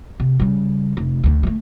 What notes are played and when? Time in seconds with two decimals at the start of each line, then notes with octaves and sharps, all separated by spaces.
0.20 C3
0.40 C#3 G3
0.97 F1
1.24 D2 D3
1.43 G3 A3